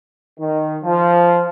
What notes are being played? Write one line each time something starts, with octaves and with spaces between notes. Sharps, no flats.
D#3
F3